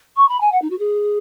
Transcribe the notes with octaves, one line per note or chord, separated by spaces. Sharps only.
C#6
B5
G#5
F#5
D#4
F#4
G#4